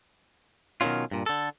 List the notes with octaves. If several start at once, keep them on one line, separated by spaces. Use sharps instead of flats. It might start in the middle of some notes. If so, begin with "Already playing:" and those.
B2 D#3 E3 F#3 C#4 F4
G2 A#2
D3 A4